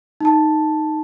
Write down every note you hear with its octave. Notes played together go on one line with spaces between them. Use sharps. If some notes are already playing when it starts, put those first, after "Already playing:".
D#4 A5